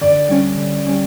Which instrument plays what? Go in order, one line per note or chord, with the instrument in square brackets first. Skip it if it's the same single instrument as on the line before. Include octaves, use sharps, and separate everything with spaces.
[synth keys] D3 [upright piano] D5
[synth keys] G3 C#4
D3
G3 C#4